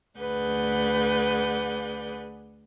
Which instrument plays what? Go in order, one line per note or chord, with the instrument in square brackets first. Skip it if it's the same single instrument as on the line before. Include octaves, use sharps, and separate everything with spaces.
[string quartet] D2 G#4 B4 D5 F#5 G6